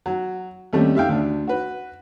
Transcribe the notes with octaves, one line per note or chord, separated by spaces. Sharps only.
F#3
D#2 G3 A3 C4 C#4
G4 E5 F5 G5
D2 D4
F#4 B4